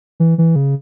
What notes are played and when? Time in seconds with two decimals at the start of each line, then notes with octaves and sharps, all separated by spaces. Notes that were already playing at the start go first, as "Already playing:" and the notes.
0.20 E3
0.38 E3
0.56 C#3